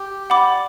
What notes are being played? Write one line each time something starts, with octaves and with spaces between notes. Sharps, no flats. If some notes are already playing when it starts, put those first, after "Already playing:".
Already playing: G4
D5 F#5 B5 D6